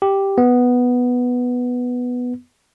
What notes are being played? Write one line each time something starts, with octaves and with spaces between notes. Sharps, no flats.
G4
B3